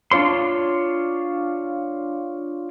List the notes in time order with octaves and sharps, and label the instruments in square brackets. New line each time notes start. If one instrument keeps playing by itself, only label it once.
[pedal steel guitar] D4 F4 C#5 C6